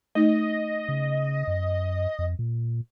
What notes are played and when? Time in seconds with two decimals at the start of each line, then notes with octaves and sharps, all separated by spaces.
0.15 A3 D#4 D#5
0.89 C#3
1.48 F#2
2.19 F2
2.39 A#2